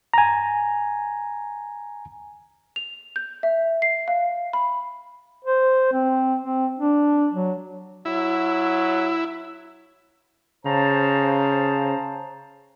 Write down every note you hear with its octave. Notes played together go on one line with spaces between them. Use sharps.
G#5 A#5
F7
G6
E5
C7
F5
B5
C5
C4
C4
D4
F#3
F#3 E4
C#3 C5 A5 A#5